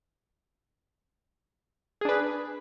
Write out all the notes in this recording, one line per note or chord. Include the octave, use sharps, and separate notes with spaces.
D4 G#4 B4